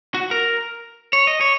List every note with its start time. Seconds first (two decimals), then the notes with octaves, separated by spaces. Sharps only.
0.15 F#4
0.31 A#4
1.13 C#5
1.27 D#5
1.41 C#5